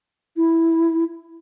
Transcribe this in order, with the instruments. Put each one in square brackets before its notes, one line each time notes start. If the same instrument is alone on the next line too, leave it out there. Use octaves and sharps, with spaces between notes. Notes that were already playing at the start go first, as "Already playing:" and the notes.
[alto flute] E4